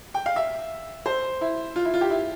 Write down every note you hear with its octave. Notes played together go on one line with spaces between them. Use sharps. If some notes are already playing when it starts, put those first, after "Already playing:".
G5
F5
E5
C5
E4
F4
E4
F4
G4
E4